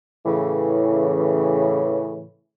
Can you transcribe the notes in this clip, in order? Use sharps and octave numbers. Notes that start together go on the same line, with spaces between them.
A2 C#3 E3